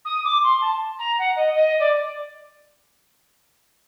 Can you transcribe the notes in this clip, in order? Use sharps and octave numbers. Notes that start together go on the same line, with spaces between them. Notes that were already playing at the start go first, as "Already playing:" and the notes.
D#6
D6
C6
A5
A#5
F#5
D#5
D#5
D5